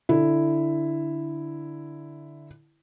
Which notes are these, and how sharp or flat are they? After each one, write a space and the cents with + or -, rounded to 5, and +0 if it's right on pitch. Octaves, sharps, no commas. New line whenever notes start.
D3 +0 E4 +0